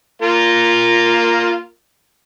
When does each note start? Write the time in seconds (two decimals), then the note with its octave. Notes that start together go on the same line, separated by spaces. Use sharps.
0.22 A#3 F4 A#4